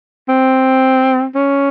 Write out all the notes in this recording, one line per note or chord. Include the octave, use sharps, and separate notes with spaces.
C4
C#4